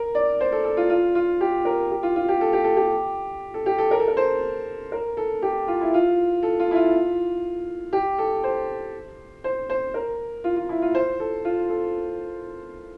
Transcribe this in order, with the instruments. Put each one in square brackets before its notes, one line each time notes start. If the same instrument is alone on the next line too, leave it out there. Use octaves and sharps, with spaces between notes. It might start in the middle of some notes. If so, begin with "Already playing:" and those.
Already playing: [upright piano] A#4
D5
C5
A4
A4
F4
F4
F4
G4
A#4
G4
F4
F4
G4
A4
G4
A4
G4
A4
G4
A4
A#4
A4
A#4
C5
A#4
A4
G4
F4
E4
F4
A4
F4
E4
F4
G4
A4
C5
C5
C5
A#4
F4
F4
E4
F4
C5
A4
F4
A4